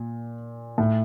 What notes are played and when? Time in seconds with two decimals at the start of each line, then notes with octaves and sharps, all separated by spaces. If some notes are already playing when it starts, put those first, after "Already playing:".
Already playing: A#2
0.78 A2